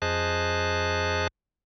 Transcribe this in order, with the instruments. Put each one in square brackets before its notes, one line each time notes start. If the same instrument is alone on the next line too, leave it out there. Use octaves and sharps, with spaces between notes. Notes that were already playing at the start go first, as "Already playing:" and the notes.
[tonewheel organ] F2 G#4 C5 D#5 A5 F#6